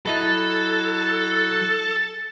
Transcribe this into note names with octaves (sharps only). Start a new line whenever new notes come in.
F#3 E4 A4 D#5 B5 A6